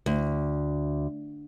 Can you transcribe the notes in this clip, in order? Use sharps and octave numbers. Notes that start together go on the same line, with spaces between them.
D2